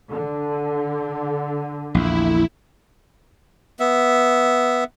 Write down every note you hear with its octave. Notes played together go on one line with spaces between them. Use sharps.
D3
A#1 E2 E4
B3 E5